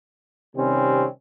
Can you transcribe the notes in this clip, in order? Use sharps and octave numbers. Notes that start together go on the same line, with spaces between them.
C3 D#3 G3 C4 C#4